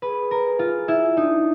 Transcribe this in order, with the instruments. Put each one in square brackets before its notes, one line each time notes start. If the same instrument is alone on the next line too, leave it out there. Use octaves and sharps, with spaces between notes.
[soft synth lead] G#4 [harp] B4
[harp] A#4
F4
E4
[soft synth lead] D4 [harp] D#4